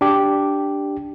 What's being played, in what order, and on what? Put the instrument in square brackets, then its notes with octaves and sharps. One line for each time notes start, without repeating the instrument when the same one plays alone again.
[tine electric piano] D4 G4